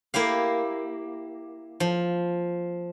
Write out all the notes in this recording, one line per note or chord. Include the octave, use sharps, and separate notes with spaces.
A#3 E4 G4 F5
F3